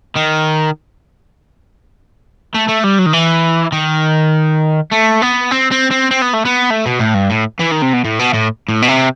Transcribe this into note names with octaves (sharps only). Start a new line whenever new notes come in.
D#3
A3
A3
G3
F#3
D#3
E3
D#3
A3
B3
C4
C4
C4
C4
B3
A3
B3
A3
B2
A2
G2
A2
E3
D#3
C3
B2
A2
B2
A2
A2
B2
C3